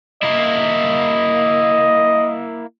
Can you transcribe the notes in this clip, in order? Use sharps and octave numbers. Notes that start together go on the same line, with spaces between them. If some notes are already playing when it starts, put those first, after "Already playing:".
A#3 E4 D#5